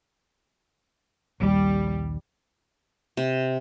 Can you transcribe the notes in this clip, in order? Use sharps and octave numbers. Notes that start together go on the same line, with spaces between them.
A#1 D#2 G3
C3